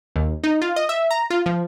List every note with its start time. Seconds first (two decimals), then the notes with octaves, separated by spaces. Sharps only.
0.16 D#2
0.43 D#4
0.62 F4
0.76 D#5
0.89 E5
1.11 A#5
1.30 F4
1.46 F3